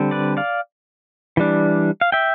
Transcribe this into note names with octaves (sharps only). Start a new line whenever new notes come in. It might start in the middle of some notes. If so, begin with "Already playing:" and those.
Already playing: D3 G3 C4
B4 D5
D5 F5
E3 G3 D4
F5
E5 G5